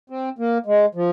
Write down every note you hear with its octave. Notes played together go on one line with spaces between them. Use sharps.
C4
A#3
G#3
F3